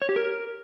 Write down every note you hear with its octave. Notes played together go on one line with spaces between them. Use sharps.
C#5
G4
A#4